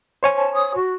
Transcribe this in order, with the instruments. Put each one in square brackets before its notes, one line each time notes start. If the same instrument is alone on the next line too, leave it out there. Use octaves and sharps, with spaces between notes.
[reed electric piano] C5 C#5 G#5
[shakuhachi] A5
D#6
F#4